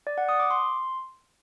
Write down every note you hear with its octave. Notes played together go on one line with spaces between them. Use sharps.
D5
F#5
D#6
D6
C6